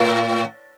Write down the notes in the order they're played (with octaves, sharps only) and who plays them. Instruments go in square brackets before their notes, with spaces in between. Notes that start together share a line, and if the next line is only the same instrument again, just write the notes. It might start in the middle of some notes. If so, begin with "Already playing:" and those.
Already playing: [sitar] A2